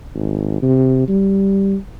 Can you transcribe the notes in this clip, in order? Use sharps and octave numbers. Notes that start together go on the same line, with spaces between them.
G#1
C3
G3